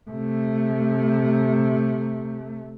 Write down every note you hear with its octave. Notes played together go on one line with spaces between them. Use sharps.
C3 A3